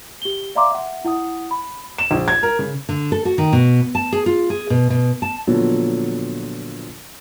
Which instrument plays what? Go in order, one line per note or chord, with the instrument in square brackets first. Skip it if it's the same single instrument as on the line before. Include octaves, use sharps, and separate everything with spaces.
[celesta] G4 G7
D5 E5 F5 A#5 C6 D6
E5 F#5
E4 F#5 D#6
B5
[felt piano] E7
A#1
G#6
A#4
C#3
[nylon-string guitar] D3
A4
F#4
D#3
B2
A5
G#4
F4
G#4
B2
B2
A5
[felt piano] A#2 D3 F3 F#3 B3